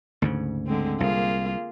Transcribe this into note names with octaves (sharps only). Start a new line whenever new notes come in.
D2 G#2 C#3
D3 G#3 C4
C2 A#3 F4 G#4